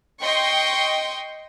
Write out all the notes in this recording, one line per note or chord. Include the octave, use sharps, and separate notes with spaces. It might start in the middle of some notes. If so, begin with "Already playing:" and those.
D#5 G5 C6 C#6